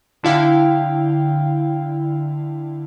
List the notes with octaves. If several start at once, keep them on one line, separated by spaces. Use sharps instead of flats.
D3 E4 F5 G5